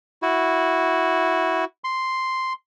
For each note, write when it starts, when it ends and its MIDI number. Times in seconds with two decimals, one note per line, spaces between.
0.22 1.65 64
0.22 1.65 66
1.84 2.53 84